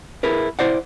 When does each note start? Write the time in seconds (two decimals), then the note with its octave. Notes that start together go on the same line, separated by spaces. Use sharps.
0.23 E4 G#4 A#4 B4
0.59 E4 C5 D5 F#5